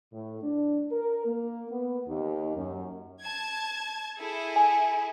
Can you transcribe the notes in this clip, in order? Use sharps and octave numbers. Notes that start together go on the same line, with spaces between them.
A2
D4
A#4
A#3
B3
D#2
F#2
A5 G#6
E4 G#4 A4
G#5